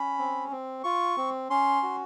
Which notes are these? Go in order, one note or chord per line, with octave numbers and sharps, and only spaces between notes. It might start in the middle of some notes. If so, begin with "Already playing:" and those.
Already playing: C#4 B5
C4
C4
F4 C#6
C4
C#4 C6
F#4